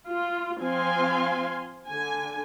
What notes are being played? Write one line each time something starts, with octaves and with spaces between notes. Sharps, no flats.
F4
F3 C4 F5 G#5 C6
D3 G#5